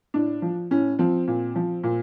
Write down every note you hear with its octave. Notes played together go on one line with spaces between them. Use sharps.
A2 D4
F3
A2 C#4
F3 C4
A#2
F3
A#2